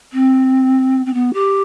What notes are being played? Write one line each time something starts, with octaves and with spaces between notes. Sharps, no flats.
C4
C4
B3
G4